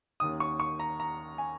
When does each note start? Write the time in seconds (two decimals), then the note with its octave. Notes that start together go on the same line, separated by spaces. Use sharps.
0.20 D#2 D#3 C#4 D#6
0.40 C#6
0.60 C#6
0.80 A#5
1.00 A#5
1.38 G#5